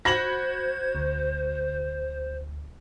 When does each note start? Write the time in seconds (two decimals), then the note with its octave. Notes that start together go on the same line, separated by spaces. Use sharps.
0.05 F#4 C5 B5 G#6 A#6 F#7
0.95 D2